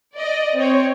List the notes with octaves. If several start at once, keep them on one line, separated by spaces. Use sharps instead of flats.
D5 D#5
C4 C#5